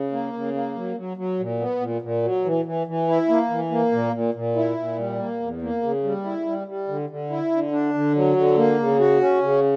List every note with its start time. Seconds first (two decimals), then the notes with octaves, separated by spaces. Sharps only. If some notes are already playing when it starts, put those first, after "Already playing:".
Already playing: C#3
0.12 A#3
0.33 C#3
0.54 A#3
0.76 F#3
0.96 F#3
1.17 F#3
1.39 A#2
1.60 B3
1.80 A#2
2.02 A#2
2.23 F#3
2.45 E3
2.65 E3
2.87 E3
3.07 E4
3.29 A#3
3.50 E3
3.71 A#3
3.92 A#2
4.13 A#2
4.34 A#2
4.56 E4
4.77 A#2
4.98 G3
5.19 A#3
5.40 E2
5.62 A#3
5.83 C#3
6.04 G3
6.24 E4
6.46 G3
6.67 G3
6.88 D3
7.10 D3
7.30 E4
7.51 D3
7.72 D4
7.94 D3
8.16 F#3
8.36 D3
8.57 A#3
8.79 C#3
8.99 F#4
9.21 C#4
9.42 C#3